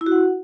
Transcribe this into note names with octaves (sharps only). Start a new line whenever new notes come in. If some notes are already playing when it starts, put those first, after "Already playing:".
E4
F#4
F#5